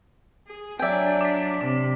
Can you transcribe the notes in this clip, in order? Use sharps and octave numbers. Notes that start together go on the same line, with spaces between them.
G#4
F#3 D4 D5 E5 G5 G#5
D6 B6
C3 D6